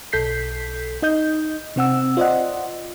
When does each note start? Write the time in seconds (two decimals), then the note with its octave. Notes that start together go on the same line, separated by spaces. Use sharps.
0.13 B1 A4 G6 B6 C7
1.02 D#4 D#5 G6
1.76 C3 C4 F#5 E6
2.17 F4 C5 D5 D#5 F#5